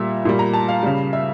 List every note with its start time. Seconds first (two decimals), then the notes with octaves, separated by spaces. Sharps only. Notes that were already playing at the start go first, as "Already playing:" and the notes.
Already playing: A#2 G3 E5
0.25 A#2 G3
0.39 A#5
0.54 A5
0.69 F5
0.83 C#3 G3
1.13 E5